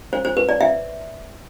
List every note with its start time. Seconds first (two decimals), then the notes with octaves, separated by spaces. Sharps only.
0.13 C5
0.25 C5
0.37 B4
0.49 D5
0.61 E5